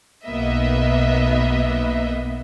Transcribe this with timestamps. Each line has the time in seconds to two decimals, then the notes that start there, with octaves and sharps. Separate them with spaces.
0.25 B1 A#3 B3 D#5 E5